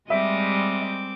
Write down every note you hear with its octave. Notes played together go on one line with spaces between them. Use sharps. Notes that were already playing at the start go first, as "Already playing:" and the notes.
G3 G#3 C4 D#5 E5 D6